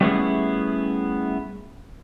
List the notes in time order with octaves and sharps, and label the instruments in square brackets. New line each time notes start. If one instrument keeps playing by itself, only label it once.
[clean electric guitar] G3 A3 B3 C#4 E4 G#4